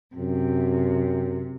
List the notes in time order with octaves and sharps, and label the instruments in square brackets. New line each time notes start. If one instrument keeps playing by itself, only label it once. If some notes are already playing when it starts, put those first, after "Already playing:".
[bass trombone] F#2 [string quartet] C3